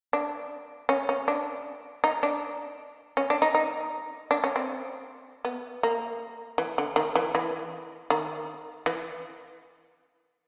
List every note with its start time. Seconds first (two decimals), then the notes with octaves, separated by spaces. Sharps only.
0.13 D4
0.89 C#4
1.09 C#4
1.28 D4
2.04 D#4
2.23 D4
3.17 C#4
3.30 D4
3.42 D#4
3.55 D#4
4.31 D4
4.44 C#4
4.56 C4
5.45 B3
5.83 A#3
6.58 E3
6.78 D3
6.96 D#3
7.16 E3
7.35 E3
8.10 D#3
8.86 E3